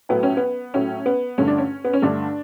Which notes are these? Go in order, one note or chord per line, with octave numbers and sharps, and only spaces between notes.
A2 F#3 A3 B3
C#4
B3
A2 F#3 A3 C#4
B3
G2 D3 A3 C#4
D4
C#4
B3
C#4
G2 D3 A3 D4